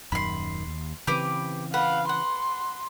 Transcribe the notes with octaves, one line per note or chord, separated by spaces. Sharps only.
D#1 F#2 D#3 B5 C6
D#2
C#3 E3 C4 G4 B4 D6
B4 F5 F#5
F#5 C6